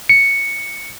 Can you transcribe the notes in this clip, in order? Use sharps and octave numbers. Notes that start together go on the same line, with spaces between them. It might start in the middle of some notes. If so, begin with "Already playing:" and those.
C#7